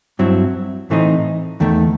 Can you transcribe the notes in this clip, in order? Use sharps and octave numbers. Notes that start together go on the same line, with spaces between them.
G2 F#3 C4 E4
A2 E3 A3 C4 D#4
E2 D#3 A3